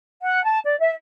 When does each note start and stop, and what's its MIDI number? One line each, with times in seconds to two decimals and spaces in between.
0.23 0.43 78
0.45 0.59 81
0.65 0.79 74
0.80 0.92 76